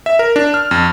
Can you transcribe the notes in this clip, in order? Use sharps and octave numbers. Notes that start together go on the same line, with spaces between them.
E5
A#4
D4
F6
F2